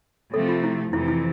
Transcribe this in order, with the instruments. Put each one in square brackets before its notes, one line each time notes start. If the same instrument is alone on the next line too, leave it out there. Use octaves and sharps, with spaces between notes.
[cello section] C3 F3 A3 [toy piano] A4
[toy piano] F4
E4
[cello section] F2 C3 E3 [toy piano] E4
[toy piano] E4